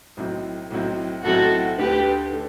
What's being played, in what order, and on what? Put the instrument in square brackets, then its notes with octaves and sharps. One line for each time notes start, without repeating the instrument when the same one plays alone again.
[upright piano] B1 A2 F#3 C4 E4
B1 A2 F#3 C4 E4
[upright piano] B1 A2 F#3 C4 E4 [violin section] F#4 A4
[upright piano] D2 D3 A3 [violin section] G4 B4
[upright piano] D3 A3